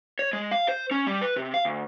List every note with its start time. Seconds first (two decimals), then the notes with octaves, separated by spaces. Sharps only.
0.19 C#5
0.33 G#3
0.51 F5
0.68 C5
0.91 C#4
1.06 G3
1.22 B4
1.36 C3
1.54 F5
1.65 D2